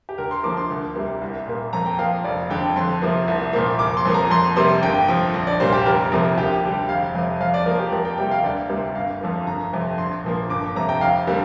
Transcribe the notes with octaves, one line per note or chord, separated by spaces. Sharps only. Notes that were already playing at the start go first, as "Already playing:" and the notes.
G4
D2 A#4
C6
D3 F3 A#3 D6
C6
D2
C3 G3 A#3
C2
A#2 A#3
F2 A#5
G5
F3 A#3 F5
F1 D5
F2 D3 G5
F2 C6
C3 F3 A#3
C2
A#2 F3 A#3
F1 D6
C6
F2 F3 A#3
A#5
F2 C6
C3 G3 A#3 C6
G1 G5
F2 F3
A#1
D5
A#2 G3 A#3 C5
G4
F1 A#4
F2 C3 F3 A#3
D2 G4
D3 G3
F1 F5
F2 C3
F2 F5
D5
F3 A#3 A#4
G4
F2 A#4
G5
C3 G3 A#3 G5
F5
D2 D5
C3 G3 A#3
G1 F5
F2 F3 A#3
G1 A#5
F2 C3
A#1 C6
A#2 F3 A#3
G1 D6
F2 C3 A#5
G5
F1 F5
D3 G3 A#3